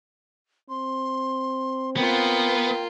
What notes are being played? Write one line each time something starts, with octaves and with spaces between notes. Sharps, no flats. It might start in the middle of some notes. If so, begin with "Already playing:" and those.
C4 C6
A#3 B3 F4 G5